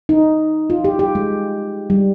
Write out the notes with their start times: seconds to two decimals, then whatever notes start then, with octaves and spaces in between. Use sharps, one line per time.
0.09 D#4
0.70 F4
0.84 G4
0.99 G4
1.15 G#3
1.90 G3